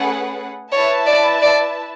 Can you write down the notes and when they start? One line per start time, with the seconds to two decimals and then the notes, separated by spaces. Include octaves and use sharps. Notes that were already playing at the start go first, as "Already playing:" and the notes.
Already playing: A3 C#4 G#4 B4 F#5
0.72 E4 B4 C#5 E5 A5
1.07 D5
1.42 D5